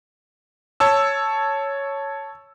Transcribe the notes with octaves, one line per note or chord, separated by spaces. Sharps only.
C#5 A5 E6